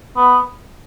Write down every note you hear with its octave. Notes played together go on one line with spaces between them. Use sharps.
B3